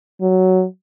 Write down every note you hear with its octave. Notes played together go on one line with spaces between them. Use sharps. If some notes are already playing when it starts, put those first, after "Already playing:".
F#3